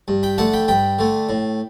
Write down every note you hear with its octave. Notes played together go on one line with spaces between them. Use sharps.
G2
G5 B5
D3 A3 F#5 A5
G5 B5
G2 G5 B5
D3 A3
A2